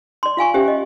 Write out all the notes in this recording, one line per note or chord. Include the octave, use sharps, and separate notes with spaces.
D5 C6
F4 F5 G#5 C#6
C#4 G4 C5 E5
D#5